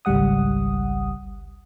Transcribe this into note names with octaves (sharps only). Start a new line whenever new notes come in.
G#1 C#2 G3 F#5 D#6